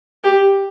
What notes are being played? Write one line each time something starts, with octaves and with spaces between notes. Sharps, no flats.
G4